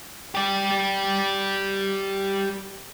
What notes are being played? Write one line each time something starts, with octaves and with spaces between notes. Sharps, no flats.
G4 D5